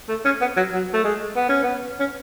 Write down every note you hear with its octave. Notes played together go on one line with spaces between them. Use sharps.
A3
C#4
B3
F#3
F#3
A3
G#3
B3
C#4
B3
C#4